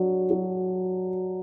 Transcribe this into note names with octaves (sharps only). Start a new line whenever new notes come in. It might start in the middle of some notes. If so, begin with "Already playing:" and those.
Already playing: F#3 D4
F#3